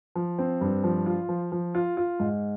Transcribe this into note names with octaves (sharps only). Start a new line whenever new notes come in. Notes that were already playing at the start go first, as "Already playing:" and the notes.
F3
C4
G2
F3
F4
F3
F3
F4
F4
G#2